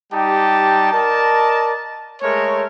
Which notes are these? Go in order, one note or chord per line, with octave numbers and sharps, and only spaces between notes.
G3 D#4 G4 G5 A5
A#4 D5 D#5 A5
G#3 A3 A#4 C#5